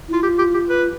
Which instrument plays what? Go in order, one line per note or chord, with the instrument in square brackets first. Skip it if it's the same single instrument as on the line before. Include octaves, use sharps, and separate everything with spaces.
[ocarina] E4 [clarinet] F4
[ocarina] F4 [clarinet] G4
[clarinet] G4
G4
B4